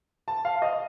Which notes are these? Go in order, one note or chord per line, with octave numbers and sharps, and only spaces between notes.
A5
F5
D#5